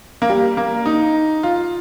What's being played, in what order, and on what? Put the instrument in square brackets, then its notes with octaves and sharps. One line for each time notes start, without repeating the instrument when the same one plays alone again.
[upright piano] A#3
G3
A#3
D#4
F4